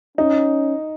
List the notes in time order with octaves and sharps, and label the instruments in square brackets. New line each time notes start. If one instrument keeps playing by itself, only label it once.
[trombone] C#4 [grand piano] D#4